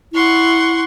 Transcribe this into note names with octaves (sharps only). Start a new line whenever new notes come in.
E4 F#5 C6 C#6